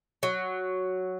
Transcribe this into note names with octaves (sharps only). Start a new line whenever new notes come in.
F#3